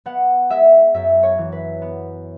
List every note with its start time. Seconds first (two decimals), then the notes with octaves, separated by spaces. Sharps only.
0.06 B3 F#5
0.50 G#3 E5
0.94 F#2 E5
1.23 C#5
1.38 E3
1.52 B4
1.82 B3